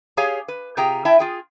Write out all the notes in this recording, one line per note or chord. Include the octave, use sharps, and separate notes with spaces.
G4 G#4 C#5 F5 G#5
B4
C3 F4 G4 G#4 G5 A#5
E4 E5 G5 A5
F4 G#4 G5